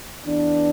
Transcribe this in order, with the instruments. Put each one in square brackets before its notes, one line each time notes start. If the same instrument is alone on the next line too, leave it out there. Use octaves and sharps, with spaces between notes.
[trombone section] E2 E3 B3 D4